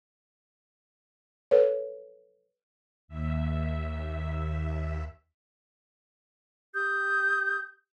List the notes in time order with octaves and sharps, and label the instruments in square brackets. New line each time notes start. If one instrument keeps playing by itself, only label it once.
[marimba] A4 B4 C#5
[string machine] D#2 E5
[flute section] G4 D#6 G6